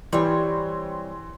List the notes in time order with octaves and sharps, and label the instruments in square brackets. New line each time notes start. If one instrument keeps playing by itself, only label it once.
[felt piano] E3 [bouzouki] G3 C4 C#5 [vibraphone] C6